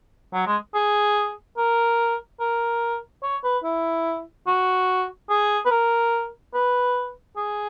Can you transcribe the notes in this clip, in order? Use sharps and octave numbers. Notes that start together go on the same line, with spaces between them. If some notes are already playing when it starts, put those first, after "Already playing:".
F#3
G#3
G#4
A#4
A#4
C#5
B4
E4
F#4
G#4
B4
A#4
B4
G#4